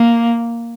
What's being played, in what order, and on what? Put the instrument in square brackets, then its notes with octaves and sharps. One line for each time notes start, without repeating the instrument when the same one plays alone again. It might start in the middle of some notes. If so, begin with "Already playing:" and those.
Already playing: [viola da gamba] A#3